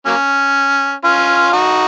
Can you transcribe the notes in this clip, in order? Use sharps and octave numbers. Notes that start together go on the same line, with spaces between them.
F#3 A#3 C#4
C#4 F4
D#4 F#4